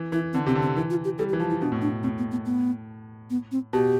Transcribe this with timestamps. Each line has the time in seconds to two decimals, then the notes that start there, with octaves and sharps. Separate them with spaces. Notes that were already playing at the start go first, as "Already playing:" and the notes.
Already playing: E3
0.12 E3 E4
0.33 D3 C4
0.46 C3 C4
0.55 D3
0.62 C4
0.76 E3 E4
0.90 F4
1.04 G4
1.18 G3 A4
1.29 G4
1.33 E3
1.40 F3 F4
1.50 E4
1.61 B2 D4
1.72 A2
1.82 D4
2.03 A2 C4
2.18 B3
2.31 B3
2.46 B3
3.30 B3
3.52 C4
3.73 B2 G4